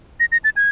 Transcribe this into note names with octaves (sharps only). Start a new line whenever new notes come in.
A#6
A#6
A6
G#6